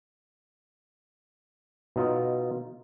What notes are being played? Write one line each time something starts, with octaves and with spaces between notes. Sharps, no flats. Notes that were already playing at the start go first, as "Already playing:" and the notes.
B2 D#4 F4